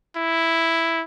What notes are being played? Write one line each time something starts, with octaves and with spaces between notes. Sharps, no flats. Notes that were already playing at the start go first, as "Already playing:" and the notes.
E4